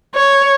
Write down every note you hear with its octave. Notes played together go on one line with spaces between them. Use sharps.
C#5